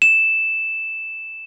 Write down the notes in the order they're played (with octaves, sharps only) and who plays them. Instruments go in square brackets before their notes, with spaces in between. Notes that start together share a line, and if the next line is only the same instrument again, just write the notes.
[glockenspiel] E7